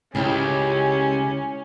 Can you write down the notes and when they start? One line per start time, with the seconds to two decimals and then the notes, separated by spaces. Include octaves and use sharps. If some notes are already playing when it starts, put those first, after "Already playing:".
0.15 C#2 C#3 C#4 E4 G4 G5